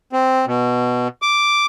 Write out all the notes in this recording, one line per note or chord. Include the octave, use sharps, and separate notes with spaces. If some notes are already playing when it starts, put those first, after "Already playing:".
C4
B2
D6